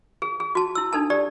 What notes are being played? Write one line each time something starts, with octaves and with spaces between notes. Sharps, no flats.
G#4
G#4
F#4 A5
E4 E6
D4 D#4 A4 A5
G4 D5